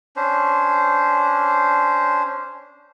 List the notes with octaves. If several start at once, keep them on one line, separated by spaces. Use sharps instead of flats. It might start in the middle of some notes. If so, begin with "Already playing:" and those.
C#4 D4 C5